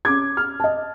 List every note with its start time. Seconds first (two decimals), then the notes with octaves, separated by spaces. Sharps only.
0.05 C#4 D6 G#6
0.37 F6
0.60 D#5 A5